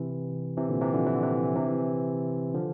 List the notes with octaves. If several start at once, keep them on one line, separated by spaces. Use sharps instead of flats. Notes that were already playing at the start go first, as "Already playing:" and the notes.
Already playing: C3 E3
C3 E3
A#2 D3
C3 E3
D3 F3
E3
D3
C3 E3
C3 E3
D3 F3